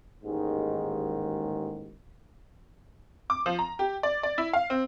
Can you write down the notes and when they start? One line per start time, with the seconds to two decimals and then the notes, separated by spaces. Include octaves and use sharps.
0.24 A1 D#2 G#2 D#3 G#3
3.30 D6
3.46 F3
3.59 A#5
3.79 G4
4.03 D5
4.23 D5
4.38 E4
4.53 F5
4.70 C4